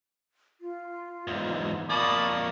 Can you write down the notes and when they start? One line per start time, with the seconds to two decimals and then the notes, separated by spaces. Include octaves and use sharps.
0.61 F4
1.27 E2 G#2
1.90 F2 A#3 D5 A5 B5 C#6 D#6